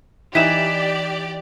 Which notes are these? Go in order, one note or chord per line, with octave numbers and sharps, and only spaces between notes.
E3 D#4 E4 G4 D5 B6 E7